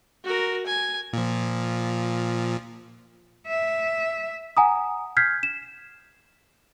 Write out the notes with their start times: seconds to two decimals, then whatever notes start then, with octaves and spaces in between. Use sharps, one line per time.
0.24 F#4 A#4
0.66 G#5
1.13 A#2 F3
3.48 E5
4.57 F#5 G#5 A#5 D#6
5.17 F6 G6 G#6 B6 C7
5.43 E7